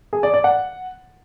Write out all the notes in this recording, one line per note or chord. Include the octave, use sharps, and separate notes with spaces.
G#4
D5
D5
F#5